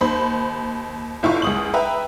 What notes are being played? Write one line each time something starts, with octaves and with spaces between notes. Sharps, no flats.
D#2 C5 B5
F#1 E4 F4 C#6
C#2 D#6 F#7
B4 E5 G5 A#5